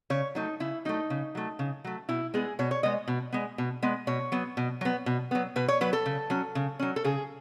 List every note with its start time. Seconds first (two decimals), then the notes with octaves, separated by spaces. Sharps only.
0.10 C#3 C#5
0.35 F#3 A3 D#4
0.60 C#3 E4
0.85 F#3 A3 D#4
1.10 C#3
1.35 F#3 A3
1.59 C#3
1.84 F#3 A3
2.09 B2 E4
2.34 G#3 B3 G#4
2.59 B2 C#5
2.71 C#5
2.83 G#3 B3 D#5
3.08 B2
3.32 G#3 B3
3.58 B2
3.82 G#3 B3
4.07 B2 C#5
4.32 F#3 B3
4.57 B2
4.81 F#3 B3
5.06 B2
5.31 F#3 B3
5.56 B2 B4
5.68 C#5
5.81 F#3 B3 B4
5.93 A4
6.06 C#3
6.30 F#3 C#4
6.55 C#3
6.79 F#3 C#4
6.96 A4
7.04 C#3 G#4